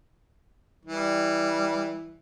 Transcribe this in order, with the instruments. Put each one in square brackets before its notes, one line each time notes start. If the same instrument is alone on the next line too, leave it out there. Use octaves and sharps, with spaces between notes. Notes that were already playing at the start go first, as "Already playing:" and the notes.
[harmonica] E3 [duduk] G3